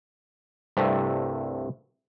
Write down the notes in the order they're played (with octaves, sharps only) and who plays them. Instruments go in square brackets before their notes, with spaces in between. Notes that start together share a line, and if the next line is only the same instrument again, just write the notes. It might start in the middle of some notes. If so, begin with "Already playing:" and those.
[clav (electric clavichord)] C2 G2 C3 A3